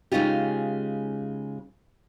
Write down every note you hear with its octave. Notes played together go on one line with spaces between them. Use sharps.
C#3 G#3 C#4 D#4 F4 G4